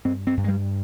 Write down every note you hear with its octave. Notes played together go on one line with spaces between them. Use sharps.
G2 C4
C4
G2
G#3
G3